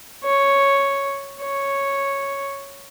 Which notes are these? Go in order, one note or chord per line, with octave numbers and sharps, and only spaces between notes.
C#5
C#5